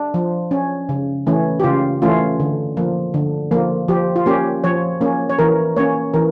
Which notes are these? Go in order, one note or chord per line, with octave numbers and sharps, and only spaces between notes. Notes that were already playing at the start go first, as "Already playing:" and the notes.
Already playing: D4
F3
C#4
C#3
E3 A3 C#4
G4
C#3 F4
E3 A3 C#4 F4
D3
F3 A#3
D3
F3 A#3
F3 G4
F4
A#3 C#4 G4
F3 C#5
A#3 C#4
C#5
E3 A#4
A#3 C#4 C#5
E3 A#4